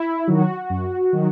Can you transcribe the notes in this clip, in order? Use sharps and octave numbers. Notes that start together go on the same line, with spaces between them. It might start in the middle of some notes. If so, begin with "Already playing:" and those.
Already playing: E4
D#3 F#3 F#4
F#2
D#3 F#3